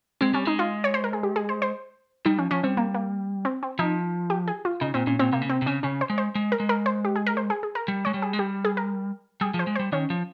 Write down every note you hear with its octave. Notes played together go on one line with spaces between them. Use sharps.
G#3 C4
G3 C#4
G#3 D#4
F4
C#5
C5
A#4
G#4
G4
G#4
C5
C5
G3 D#4
F3 C#4
F3 C#4
G3 C4
A#3
A#3
C4
C4
F3 D#4
G4
G#4
F4
C#3 D#4
A#2 C4
A#2 C#4
A#2 C4
C3 A#3
C#3
C3 C4
C3
C#3 C#4
C#3 C#4
C5
G#3
C5
G#3
A#4
G#3
A#4
C5
G4
G#4
A#4
C5
G#4
G#4
A#4
G3
G#3 C#5
G3
G#4
G#3
G3 G4
G#4
A#4
G3 G#4
F3
C5
G#3
C5
G3
D#3 C#4
F3